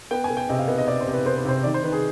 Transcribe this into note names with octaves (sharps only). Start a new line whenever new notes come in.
B3 G5
G#5
B3
G5
C3 D#5
F5
B3 D#5
D#5
C3 D5
C5
C3
B4
B3 C5
B4
C3 C5
D#3 D5
C5
D#3 B4
G#4